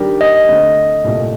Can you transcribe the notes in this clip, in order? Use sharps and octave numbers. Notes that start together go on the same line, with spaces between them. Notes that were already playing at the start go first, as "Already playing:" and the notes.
Already playing: D#3 G3 D4 G4 A#4
D#5
D3 A3 C4
C2 A#2 A3